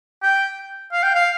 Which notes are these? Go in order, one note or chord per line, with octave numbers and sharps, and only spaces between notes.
G5
F5
G5
F5